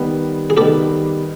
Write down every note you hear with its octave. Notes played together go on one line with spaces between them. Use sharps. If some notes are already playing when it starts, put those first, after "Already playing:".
Already playing: D#3 G3 B3
G#4
D#3 G3 B3 G4 A4